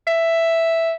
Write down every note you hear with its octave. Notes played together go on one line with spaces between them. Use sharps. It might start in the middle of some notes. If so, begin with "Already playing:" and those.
E5